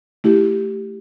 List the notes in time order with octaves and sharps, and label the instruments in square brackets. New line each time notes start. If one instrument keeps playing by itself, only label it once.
[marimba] A3 E4 G4